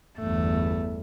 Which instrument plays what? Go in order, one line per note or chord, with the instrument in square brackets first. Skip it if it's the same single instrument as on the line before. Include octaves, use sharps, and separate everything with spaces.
[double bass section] G1 E2 [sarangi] A3